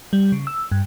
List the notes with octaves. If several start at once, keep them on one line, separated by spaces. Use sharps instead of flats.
G3
C#3
E6
G2